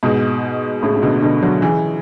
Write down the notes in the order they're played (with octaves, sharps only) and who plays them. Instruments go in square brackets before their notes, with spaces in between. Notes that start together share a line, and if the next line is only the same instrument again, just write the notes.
[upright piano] G#2 B2
A2 C#3
C#3
B2 D3
B2 D3
D3 F#3
C#3 E3